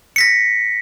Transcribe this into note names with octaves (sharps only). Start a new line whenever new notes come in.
A#6 B6 C#7